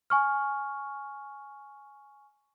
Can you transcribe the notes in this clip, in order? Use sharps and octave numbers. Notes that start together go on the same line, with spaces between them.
G#5 C#6 F6